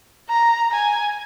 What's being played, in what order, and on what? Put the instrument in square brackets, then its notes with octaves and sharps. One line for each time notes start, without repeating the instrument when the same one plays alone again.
[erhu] A#5
G#5